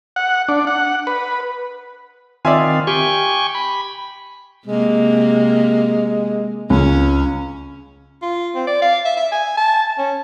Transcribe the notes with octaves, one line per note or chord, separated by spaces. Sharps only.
F#5
D4
F#5
B4
D#3 C4 F4 D5 E5 G#5
G4 G5 G#5 C#6
B5
C3 G#3 A#3
C#2 C#4
F4
C4
D5
F5
E5
E5
G#5
A5
C#4